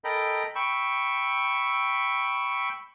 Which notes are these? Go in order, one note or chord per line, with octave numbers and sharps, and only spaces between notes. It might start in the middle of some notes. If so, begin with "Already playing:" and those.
A4 A#4 D#5 G5 B5
G5 B5 C#6 E6